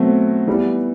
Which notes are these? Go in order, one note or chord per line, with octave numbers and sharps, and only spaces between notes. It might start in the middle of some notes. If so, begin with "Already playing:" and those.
Already playing: B2 F#3 A3 C4
E3 G3 B3